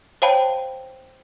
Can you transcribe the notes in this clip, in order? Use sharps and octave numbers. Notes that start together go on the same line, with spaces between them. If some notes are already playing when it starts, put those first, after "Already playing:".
C5 C#5 F5 G5 A5 B5